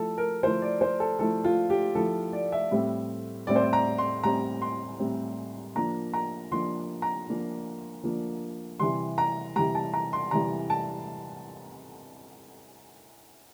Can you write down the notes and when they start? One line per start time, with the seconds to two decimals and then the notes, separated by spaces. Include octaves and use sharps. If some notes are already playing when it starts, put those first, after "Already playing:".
Already playing: F3 A3 E4 A4
0.18 A#4
0.43 F3 A3 E4 C5
0.62 D5
0.81 C5
1.00 A4
1.19 F3 A3 E4 A4
1.44 F4
1.70 G4
1.95 F3 A3 E4 A4
2.33 D5
2.52 E5
2.71 A2 G3 C4
3.47 A2 G3 C4 D5
3.56 C5
3.63 D5
3.73 A#5
3.98 C6
4.23 A2 G3 C4 A#5
4.62 C6
5.00 A2 G3 C4
5.75 F3 A#3 D4 A#5
6.13 A#5
6.52 F3 A#3 D4 C6
7.02 A#5
7.28 F3 A#3 D4
8.03 F3 A#3 D4
8.79 C3 E3 G3 C6
9.18 A#5
9.56 C3 E3 G3 A#5
9.75 A5
9.93 A#5
10.13 C6
10.31 C3 E3 G3 A#5
10.70 A5